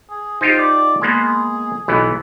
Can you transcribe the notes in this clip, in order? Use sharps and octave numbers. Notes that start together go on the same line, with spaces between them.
G#4
D#4 F4 G4 C5
D5
G#3 A#3 B3 G#4
B1 E3 B3